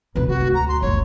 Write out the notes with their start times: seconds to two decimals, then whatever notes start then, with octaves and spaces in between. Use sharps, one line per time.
0.15 D2 C3 B4
0.28 F#4
0.41 D2
0.54 A#5
0.68 C6
0.82 F#1 D2 C#5